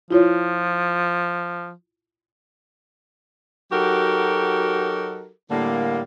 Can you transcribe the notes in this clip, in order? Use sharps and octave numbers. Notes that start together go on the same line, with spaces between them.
F3 E4 F4 C#5
F#3 D#4 F#4 G4 A4 A#4
A2 D3 G3 A#3